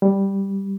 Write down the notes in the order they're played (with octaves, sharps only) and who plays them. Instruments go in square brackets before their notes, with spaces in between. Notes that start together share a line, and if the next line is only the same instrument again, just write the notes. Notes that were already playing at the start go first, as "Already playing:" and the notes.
[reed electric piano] G3